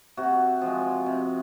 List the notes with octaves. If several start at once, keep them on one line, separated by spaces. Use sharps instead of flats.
C3 F#4
F3 G#3
C3